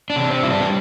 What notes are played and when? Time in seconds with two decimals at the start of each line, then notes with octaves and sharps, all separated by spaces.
0.10 D4
0.16 C3
0.30 C4
0.43 G3 E4
0.50 D4
0.61 C4